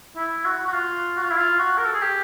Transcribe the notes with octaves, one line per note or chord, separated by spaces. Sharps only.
E4
F#4
F#4
F4
F#4
F4
E4
F4
F#4
A#4
A4
G#4
G4